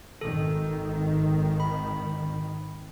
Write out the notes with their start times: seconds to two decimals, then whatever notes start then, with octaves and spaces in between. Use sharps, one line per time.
0.21 G#1 D#3 A4
1.60 B5